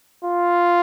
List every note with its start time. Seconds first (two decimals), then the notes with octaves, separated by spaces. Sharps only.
0.25 F4